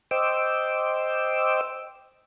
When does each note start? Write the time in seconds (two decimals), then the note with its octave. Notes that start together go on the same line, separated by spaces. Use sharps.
0.11 C5 D#5 G5 D6 E6